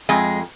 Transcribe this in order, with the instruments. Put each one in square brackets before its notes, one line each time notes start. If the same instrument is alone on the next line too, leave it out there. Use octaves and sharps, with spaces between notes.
[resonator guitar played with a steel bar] F2 G#3